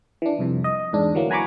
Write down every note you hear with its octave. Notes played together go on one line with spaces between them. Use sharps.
E3 D4
C2 F2 C3
D#5
E2 G#2 D4
D2 E3 F#3 A#3
F#5 G#5 A#5 B5 C#6 D6